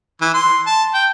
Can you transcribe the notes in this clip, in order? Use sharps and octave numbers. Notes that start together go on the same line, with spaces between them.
E3
C6
A5
G5